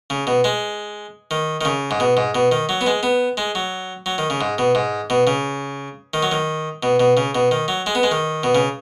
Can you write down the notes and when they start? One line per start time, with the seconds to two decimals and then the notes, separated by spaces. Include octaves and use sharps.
0.10 C#3
0.27 B2
0.44 G#3
1.31 D#3
1.61 D#3
1.65 C#3
1.91 G#2
2.00 B2
2.17 G#2
2.35 B2
2.52 D#3
2.69 F#3
2.81 B3
2.86 G#3
3.03 B3
3.37 G#3
3.55 F#3
4.06 F#3
4.18 D#3
4.30 C#3
4.41 G#2
4.58 B2
4.75 G#2
5.10 B2
5.27 C#3
6.14 D#3
6.23 F#3
6.32 D#3
6.83 B2
7.00 B2
7.17 C#3
7.35 B2
7.51 D#3
7.68 F#3
7.86 G#3
7.95 B3
8.03 G#3
8.11 D#3
8.43 B2
8.55 C#3